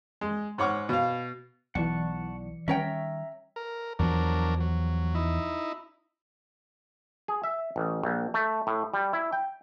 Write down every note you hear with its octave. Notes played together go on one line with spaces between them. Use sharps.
G#3
G#2 C#5 F#5 C#6 D6 F6
B2 F5
B1 E3 D5 F#5 A5 C#6 C#7
D#3 G3 C#4 C#5 E5 G5 A#5
A#4
E2 F3 F#3 D4 A#4
F#3
D#4 E4
G#4
E5
A1
A#1
A3
A2
G3
E4
G5